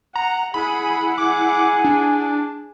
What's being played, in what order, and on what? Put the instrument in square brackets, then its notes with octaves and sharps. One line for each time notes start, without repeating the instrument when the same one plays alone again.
[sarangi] F#5 [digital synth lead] A#5
[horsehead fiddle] E4 F#5 [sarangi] G#4 [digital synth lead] B5
[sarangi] G#4 [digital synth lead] D6
[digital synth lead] D4